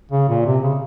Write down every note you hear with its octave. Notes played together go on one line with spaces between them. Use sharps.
C#3
A#2
C3
C#3